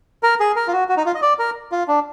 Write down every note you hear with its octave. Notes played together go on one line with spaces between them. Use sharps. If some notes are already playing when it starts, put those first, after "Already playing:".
A#4
G#4
A#4
F4
F#4
F#4
D#4
F4
D#5
D5
A#4
F4
D4